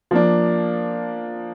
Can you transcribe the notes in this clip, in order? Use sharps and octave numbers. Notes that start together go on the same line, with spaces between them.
F3 A#3 D4